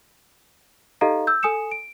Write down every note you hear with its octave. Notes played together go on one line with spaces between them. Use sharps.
D#4 G4 A4 D#5 F5 A#5
E6 G6
A4 G#5 D#6 C#7 E7
D7